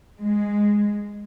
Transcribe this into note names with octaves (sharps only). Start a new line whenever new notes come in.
G#3